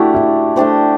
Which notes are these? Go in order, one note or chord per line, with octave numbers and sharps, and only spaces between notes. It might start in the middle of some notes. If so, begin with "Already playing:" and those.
Already playing: A3 D4 E4 F#4 G4
E4
A3 D4 G4 C5